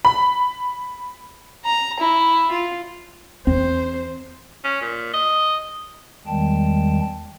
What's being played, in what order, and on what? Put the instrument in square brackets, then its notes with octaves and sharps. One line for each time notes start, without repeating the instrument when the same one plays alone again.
[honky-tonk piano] B5
[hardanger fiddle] A#5
E4
F4
[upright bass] E2 [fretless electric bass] C4 [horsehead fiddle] C5
[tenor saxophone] C#4
A#2
D#5
[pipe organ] E2 D#3 G3 G#3 G5 A5